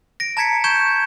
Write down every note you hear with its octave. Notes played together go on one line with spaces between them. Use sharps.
A#6 D7
A5 A#5 G#6 B6 C#7
C#6 G6 G#6 E7